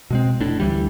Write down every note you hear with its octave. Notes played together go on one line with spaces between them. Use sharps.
B2 G#3 C4
F1 A2 D4
D2 E3 G3